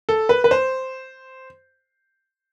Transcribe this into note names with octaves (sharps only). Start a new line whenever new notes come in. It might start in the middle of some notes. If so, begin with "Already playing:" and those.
A4
B4
B4
C5